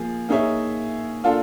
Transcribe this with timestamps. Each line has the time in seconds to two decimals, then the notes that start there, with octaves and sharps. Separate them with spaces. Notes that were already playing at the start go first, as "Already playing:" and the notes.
Already playing: F3 A#3 G#4
0.29 A#3 D#4 G#4 C#5 E5
1.24 A#3 D4 F4 A4